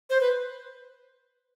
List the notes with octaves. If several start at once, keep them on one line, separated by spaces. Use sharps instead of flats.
C5
B4